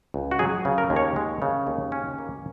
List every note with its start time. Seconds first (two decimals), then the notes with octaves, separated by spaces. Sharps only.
0.14 C#2
0.31 F#4
0.39 F#3 G#4
0.65 C#3
0.78 A#4
0.90 D#2
0.96 C#5
1.16 G#3
1.42 C#3
1.67 D#2
1.92 C#4
2.19 A#3